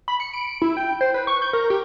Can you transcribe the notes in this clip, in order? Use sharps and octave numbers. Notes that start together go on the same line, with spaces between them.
B5
C#7
D7
E4
G5
C5
B4
C#6
G6
A#4
G4